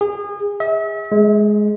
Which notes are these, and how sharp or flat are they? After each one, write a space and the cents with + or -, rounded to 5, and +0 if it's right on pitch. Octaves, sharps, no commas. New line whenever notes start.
G#4 -30
E5 -40
G#3 +10